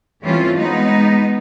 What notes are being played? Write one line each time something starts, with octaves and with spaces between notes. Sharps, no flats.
E3 G3 A3 C4 C#4 F4
G#3 B3 D#4